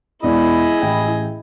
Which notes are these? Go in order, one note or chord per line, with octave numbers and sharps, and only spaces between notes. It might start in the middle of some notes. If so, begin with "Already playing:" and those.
E1 B3 E4 G#4 D5 D#5 B5
A1 G5